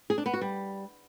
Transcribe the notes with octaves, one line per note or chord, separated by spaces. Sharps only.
G#4
D4
B3
F#4
G3